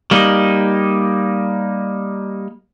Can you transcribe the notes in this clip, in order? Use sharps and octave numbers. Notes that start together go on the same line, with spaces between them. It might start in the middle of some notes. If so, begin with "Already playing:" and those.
G3 A#3 D#4